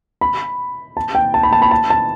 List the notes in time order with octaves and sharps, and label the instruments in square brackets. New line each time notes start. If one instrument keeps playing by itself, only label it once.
[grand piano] B5
A5
G5
A5
B5
A5
B5
A5
A5